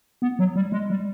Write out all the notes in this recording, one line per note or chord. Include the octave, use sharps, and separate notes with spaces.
B3
F#3
G3
G#3
G3